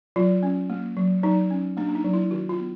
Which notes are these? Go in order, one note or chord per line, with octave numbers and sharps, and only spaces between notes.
F#3 F4
C#4
A#3
F#3
F#3 D#4
C#4
A#3 D4
D4
D#4
F#3
E4
D#3 F#4
F4
B3